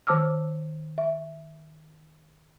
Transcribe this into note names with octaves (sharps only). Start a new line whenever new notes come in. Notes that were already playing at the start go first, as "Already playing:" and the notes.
D#3 C5 A5 D6 E6 F6
E5